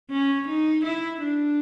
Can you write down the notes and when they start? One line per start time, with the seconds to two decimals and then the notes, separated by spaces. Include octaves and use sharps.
0.11 C#4
0.48 D#4
0.85 E4
1.23 D4